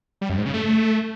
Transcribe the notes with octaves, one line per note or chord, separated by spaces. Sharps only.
G3
F#2
G#2
C#3
A3